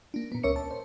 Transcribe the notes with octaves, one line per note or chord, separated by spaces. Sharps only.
A#3 D4
A#2 B3
C#2 C#4 A#4 C#5 E5 C#7
A5
C5